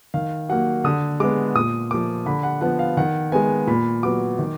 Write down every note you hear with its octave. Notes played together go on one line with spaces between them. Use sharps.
D#3 F5
F#3 A#3 F#5
D3 D#6
G#3 B3 D6
A#2 D#6
F3 A#3 D6
D3 B5
F#5
F3 B3 F#5
F5
D#3 F#5
G#3 B3 G#5
A#2 B5
F#3 B3 D6
D#3